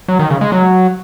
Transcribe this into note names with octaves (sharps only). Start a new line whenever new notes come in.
F#3
D#3
C#3
G#3
F#3